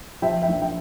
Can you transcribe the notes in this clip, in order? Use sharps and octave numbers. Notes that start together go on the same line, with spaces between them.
F3 E5 G5
E5 G5
A#1
E5 G5